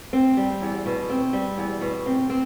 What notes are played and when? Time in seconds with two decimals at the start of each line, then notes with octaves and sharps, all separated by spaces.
0.13 C4
0.37 G3
0.62 E2
0.86 B2
1.10 C4
1.33 G3
1.58 E2
1.81 B2
2.06 C4
2.30 C4